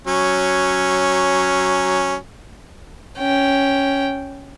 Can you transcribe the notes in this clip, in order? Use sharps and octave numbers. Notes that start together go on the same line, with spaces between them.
F#3 C#4
C#4 G5